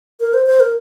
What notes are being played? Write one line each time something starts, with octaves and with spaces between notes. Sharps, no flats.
A#4
C5
C5
A#4